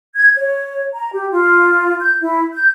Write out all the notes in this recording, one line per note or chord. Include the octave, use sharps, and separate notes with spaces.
G#6
C#5
A#5
G4
F4
G6
E4
G6